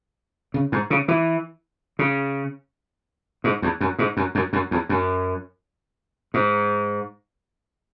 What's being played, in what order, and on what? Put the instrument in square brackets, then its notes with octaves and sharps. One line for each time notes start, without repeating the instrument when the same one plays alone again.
[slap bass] C#3
G#2
C#3
E3
C#3
G#2
E2
F#2
G#2
F#2
F#2
F#2
E2
F#2
G#2